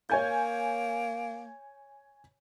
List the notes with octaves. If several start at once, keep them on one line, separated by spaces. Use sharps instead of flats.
A#3 C#5 G#5 G6